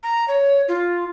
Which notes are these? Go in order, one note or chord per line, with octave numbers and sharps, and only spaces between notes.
A#5
C#5
F4